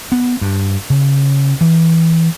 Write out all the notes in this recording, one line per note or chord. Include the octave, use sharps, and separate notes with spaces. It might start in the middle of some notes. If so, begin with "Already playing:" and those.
B3
G2
C#3
E3